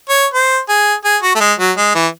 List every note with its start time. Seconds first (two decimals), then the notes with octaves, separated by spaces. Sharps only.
0.09 C#5
0.34 C5
0.69 G#4
1.05 G#4
1.23 F#4
1.35 A3
1.40 G#3
1.59 F#3
1.77 G#3
1.95 E3